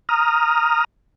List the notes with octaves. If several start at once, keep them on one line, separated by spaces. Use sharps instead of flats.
A#5 D#6 F6